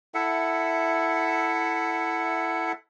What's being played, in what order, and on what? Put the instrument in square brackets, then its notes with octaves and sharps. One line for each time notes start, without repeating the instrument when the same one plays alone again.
[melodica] E4 A4 E5 F#5